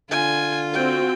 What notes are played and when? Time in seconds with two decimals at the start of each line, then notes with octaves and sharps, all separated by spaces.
0.11 D3 F4 G#5
0.74 C4 F#4 G5